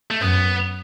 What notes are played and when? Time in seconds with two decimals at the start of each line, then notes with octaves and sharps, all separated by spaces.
0.11 A3
0.21 F#2 B3